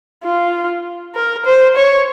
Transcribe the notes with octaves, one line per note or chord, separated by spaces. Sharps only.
F4
A#4
C5
C#5